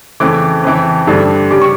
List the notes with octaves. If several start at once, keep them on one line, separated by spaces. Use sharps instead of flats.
F2 C#3 E3 A3 D6
F2 C#3 E3
G2 D3 A3 D4
C#3 G3 C#4 D6
C#6